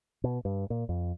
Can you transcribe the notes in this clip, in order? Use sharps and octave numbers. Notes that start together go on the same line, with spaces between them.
B2
G2
A#2
F2